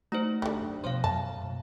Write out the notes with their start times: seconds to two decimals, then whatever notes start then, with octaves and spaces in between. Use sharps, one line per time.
0.12 A3 D#4 F#4 C5
0.42 D2 D3 G3
0.59 F#2
0.84 B2 F3 A3 C5 C#5 F5
1.04 F#2 A5
1.42 A#2